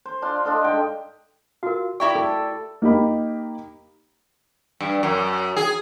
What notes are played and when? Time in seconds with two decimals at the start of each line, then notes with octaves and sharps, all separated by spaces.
0.06 C5
0.22 D4 F4 C6
0.45 D4 F4 A4 D#5
0.64 G#2 G5
1.63 F4 F#4 A#4 F5
2.00 E4 G4 D5 E5 G5 C#6 G#6
2.15 A4
2.82 A#3 D#4 G4 B5
4.81 G2
5.03 F#2
5.56 G#4